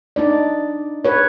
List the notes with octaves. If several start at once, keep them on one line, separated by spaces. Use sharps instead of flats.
D4 D#4 D5
G#4 B4 C#5